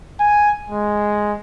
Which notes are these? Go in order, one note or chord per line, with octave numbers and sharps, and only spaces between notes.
G#5
G#3